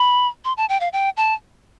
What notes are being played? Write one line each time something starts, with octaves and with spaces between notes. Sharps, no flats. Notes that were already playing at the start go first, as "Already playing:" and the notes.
Already playing: B5
C6
A5
G5
F5
G5
A5